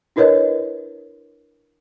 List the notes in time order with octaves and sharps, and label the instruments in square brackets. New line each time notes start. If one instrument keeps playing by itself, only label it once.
[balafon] D4 E4 A#4 B4 C#5 D#5